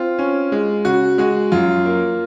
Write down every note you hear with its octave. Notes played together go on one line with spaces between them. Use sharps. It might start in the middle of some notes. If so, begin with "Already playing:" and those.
Already playing: C4 F4
C#4
G#3
C#3 F#4
G#3 F#4
F#2 F4
A#3